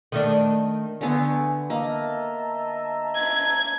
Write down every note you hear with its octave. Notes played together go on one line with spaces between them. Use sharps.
D#3 A3 D4
D3 A3 B3 G#5
A#3 D#5 E5 A5 A#5
G#6